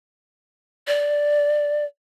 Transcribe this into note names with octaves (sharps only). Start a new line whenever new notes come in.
D5